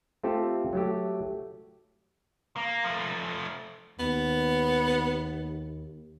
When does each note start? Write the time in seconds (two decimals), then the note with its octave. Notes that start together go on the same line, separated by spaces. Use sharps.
0.23 A3 C4 F4 G4 A4
0.73 F#3 A3 G4
2.56 A#3
2.84 F3 A3
4.00 D#2 B3